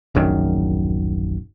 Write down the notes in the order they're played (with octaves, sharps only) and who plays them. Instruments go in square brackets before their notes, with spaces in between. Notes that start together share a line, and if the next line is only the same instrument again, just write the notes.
[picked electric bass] D1 A#1 F#2 D#3